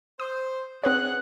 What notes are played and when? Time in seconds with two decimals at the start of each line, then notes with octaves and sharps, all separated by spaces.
0.20 C5 D#6
0.84 C4 G#4 B4 C#5 F#5 F#6